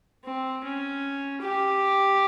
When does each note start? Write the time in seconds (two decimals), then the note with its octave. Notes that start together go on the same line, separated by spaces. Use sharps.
0.24 C4
0.64 C#4
1.42 G4